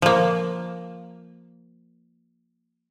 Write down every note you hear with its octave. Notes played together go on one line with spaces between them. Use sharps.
F3 A#3